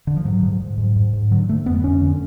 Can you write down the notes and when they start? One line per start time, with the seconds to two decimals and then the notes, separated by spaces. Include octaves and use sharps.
0.07 D3
0.17 F3
0.25 G#2 F#3
0.43 G#2
0.61 G#2
0.78 G#2
0.96 G#2
1.13 G#2
1.31 D3 F#3
1.48 D3 A3
1.66 F2 B3
1.84 F2 C#4
2.02 D3